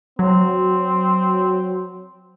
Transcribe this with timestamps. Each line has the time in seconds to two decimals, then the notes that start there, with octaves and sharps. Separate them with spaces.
0.19 F#3 C4